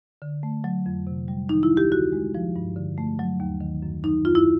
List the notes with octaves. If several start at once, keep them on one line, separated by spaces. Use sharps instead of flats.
D3
A3
F#3
F2
C3
G3
D#3 D#4
E4
D2
G4
D3 F#4
G#3
F3
G2
D3
A3
F#3
D#2
D#3
F#2
F#3 D#4
F#2 F4
E4